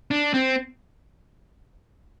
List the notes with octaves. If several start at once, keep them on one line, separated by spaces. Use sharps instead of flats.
D4
C4